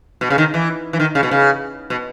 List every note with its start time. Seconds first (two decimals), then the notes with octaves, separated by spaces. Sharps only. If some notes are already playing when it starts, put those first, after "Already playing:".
0.21 B2
0.30 C#3
0.38 D#3
0.54 E3
0.93 E3
1.00 D#3
1.15 C#3
1.23 B2
1.31 C#3
1.90 B2